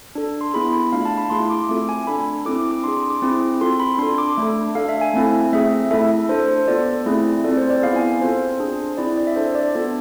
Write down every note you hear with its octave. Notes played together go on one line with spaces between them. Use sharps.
D4 A4
C6
B3 E4 G#4 B5
B5
A3 D4 F4 F5
A5
B5
A3 E4 G#4 C6
D6
A3 C4 F4 A4 D6
G#5
D4 A4 B5
C4 E4 A4 D6
D6
D4 G#4 C6
C6
D6
C4 E4 G#4
C4 F4 A4 C6
B5
D4 A4 C6
D6
A3 D4 A4
D4 A4 F5
E5
G#5
A3 C4 E4 A4
A3 C4 G#4 E5
A3 E4 A4 E5
D4 A4 C5
C5
B3 F4 A4 D5
A3 C4 E4 G#4
C4 F4 A4 D5
C5
D5
B3 E4 G#4 F5
G#5
C4 F4 A4 C5
D4 G#4
C4 E4 G#4 D5
D5
E5
D4 A4 C5
D5
B3 D4 F4 A4